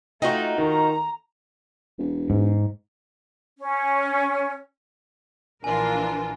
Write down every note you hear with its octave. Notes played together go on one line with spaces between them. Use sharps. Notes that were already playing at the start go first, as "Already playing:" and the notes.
A3 D#4 F4 F#4 D#5 G5
D#3 A#5
E1
G#2
C#4
A#1 E3 D4 F4 A#4 G#5